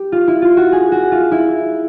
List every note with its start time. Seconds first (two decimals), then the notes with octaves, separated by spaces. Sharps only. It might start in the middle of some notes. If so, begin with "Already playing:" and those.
Already playing: G4
0.12 F4
0.27 E4
0.42 F4
0.57 F#4
0.72 G#4
0.92 F#4
1.12 F4
1.31 E4